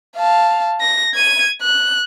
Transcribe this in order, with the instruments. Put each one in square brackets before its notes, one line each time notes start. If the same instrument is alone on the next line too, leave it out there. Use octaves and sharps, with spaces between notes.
[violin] F5 A5
A#6
G#6 D#7
F#6